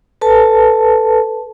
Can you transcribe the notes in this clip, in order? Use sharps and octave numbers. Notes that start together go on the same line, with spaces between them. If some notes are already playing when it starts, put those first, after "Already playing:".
A4 B4 A5